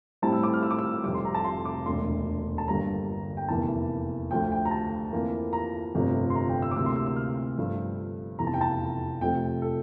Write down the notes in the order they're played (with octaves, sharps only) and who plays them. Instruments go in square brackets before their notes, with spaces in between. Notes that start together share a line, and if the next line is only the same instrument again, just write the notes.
[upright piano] A2 G3 C4 E4 A5
E6
D6
F6
E6
D6
E6
F1 F2 C3 G3 D6
C6
A#5
A5
C6
D6
E1 D2 D3 C6
A5
G1 G2 D3 G3 A#3 A#5
G5
F1 E2 E3 A#3 A5
D2 D3 F3 G5
G5
A#5
A5
F2 E3 A#3 F4
A#5
G1 F2 C3 F3 A3
C6
A#5
G5
E6
D6
D2 C3 E3 A#3 E6
C6
E6
E6
F6
G1 G2 F3 A3
F1 E2 E3 A#5
A5
G5
A5
F2 C3 F3 A3 G5
A4